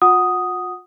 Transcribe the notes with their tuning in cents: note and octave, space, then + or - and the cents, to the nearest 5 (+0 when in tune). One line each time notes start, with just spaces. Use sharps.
F4 +45 F#5 +0 D#6 +0